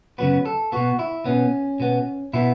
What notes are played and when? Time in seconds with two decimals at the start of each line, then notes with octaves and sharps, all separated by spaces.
0.18 F#2 C#3 F#3 B3 B4
0.46 A4
0.72 B2 B3 F#4
0.99 E4
1.25 B2 B3 C#4
1.80 B2 B3
2.33 B2 B3 E4